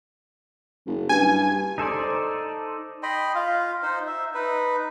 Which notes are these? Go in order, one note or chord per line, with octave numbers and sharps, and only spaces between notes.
F#1
G2 G#5
D#4 A4 C5 D5
D#5 G5 B5 C6
F4 F5
D#4 C5
E5
D#4 B4